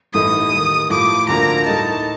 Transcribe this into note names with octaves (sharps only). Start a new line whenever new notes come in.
A1 A2 A3 D#4 D#6
D#2 D#3 A3
A2 F3 A3 D6
D2 D3 F3 A#3 A#5
A2 A3 D#4 A5